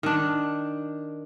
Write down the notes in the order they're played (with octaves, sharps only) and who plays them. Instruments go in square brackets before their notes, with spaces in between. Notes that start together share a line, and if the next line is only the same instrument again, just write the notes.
[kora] D#3 D4